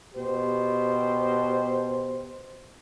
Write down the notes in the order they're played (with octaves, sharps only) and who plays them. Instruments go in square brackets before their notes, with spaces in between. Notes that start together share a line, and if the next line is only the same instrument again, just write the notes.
[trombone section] B2 G4 C5